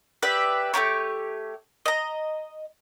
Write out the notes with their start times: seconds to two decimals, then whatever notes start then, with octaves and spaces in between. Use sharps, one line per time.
0.23 G4 B4 D5 E5
0.74 A3 D#4 G4 C#5
1.86 D#5 A#5